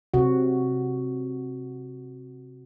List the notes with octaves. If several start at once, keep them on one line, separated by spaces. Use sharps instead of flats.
C3 F#4